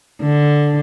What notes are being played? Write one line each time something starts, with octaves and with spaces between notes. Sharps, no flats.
D3